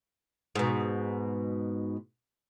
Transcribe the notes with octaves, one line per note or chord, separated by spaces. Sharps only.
G#2 B2